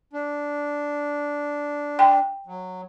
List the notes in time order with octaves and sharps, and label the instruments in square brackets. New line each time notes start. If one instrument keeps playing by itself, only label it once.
[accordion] D4
[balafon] G5
[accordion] F#3